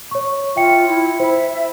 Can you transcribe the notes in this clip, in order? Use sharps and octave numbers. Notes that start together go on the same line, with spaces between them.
C#5 C#6
F4 E5 G5 C#7
E4
C5 E5 B5